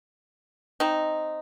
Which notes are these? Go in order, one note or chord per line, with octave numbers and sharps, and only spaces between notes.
C4 D#4